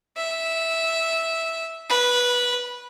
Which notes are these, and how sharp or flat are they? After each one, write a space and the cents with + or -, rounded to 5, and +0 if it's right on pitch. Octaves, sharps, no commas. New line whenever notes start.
E5 -10
B4 -15